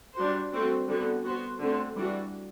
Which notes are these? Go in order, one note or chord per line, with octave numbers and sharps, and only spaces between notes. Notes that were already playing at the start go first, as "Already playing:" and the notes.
G3 D4 F#4 C5
A3 C4 F#4
D3 G3 B3 F#4
B3 F#4 C5
D3 A3 C4
E3 G3 D4 F#4